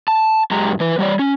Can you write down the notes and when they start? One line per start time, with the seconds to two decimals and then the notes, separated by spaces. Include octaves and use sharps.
0.08 A5
0.51 F#2 G#3 G4 A#5
0.80 E3 B4
0.99 G3 C#5 D5
1.19 C#4